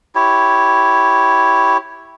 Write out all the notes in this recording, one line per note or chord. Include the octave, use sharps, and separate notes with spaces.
E4 G4 C#5